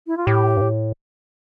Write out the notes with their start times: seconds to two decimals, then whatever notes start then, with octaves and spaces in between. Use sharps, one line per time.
0.07 E4
0.17 F4
0.26 A2 G4
0.57 G2
0.61 A2